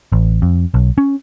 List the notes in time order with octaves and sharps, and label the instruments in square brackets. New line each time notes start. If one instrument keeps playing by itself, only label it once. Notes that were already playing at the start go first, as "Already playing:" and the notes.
[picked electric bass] A1
F2
B1
C#4